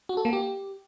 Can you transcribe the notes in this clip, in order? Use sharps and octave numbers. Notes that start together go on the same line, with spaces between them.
F#4
A4
A#3
G4